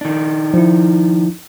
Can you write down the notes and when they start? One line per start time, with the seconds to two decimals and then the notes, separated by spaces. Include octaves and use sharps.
0.01 D#3 D4
0.54 F3 E4